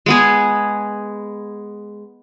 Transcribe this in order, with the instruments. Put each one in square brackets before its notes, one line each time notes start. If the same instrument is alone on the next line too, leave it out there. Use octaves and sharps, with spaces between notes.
[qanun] G#3 B3 G#4